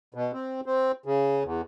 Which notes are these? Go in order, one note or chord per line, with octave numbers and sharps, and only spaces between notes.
B2
C4
C4
C#3
E2